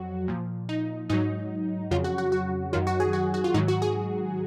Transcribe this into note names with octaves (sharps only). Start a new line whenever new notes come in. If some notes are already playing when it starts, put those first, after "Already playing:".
Already playing: F2 F#3 F#4
A#2 F3
D#4
G#2 F#3 D#4
F2 C#3 F#3 F4
F#4
F#4
F#4
F#2 D#3 F#3 F4
F#4
G#4
F#4
F#4
F4
G#2 D#3 F#3 D#4
F#4
G#4